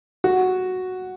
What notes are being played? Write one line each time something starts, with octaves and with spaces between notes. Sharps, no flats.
F#4